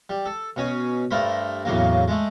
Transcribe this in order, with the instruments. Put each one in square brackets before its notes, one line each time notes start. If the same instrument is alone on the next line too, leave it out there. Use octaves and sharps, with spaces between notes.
[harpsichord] G3
A4
B2 C#4 G#5
G2 A3 A#4 C5 B5
E2 A2 C#3 F#3 A#3
G#3 A3